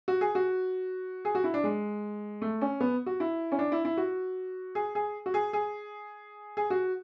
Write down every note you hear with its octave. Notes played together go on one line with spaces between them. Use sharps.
F#4
G#4
F#4
G#4
F#4
E4
D4
G#3
A3
C#4
B3
F#4
E4
C#4
D4
E4
E4
F#4
G#4
G#4
F#4
G#4
G#4
G#4
F#4